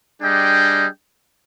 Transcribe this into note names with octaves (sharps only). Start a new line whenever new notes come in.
G3 D4 G#4 D#5 G5